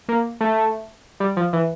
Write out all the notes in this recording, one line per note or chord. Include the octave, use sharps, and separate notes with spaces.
A#3
A3
G3
F3
E3